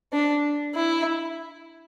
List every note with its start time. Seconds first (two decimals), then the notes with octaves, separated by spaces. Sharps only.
0.13 D4
0.75 E4